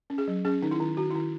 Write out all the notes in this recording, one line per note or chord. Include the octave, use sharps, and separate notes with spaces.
C#4
G#4
F#3
C#4 G#4
D#3 D#4
E4
D#3
D#3 F#4
D#3 E4